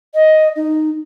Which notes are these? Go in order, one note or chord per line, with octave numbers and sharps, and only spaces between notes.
D#5
D#4